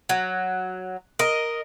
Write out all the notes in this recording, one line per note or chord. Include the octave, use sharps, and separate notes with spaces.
F#3
A#4 D#5